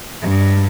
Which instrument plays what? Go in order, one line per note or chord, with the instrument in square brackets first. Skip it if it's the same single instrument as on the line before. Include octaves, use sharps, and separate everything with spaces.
[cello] G2